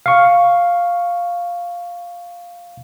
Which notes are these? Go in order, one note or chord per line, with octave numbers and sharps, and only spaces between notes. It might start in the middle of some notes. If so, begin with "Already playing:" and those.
F5 C#6